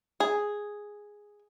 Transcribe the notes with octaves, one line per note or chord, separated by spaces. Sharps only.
G#4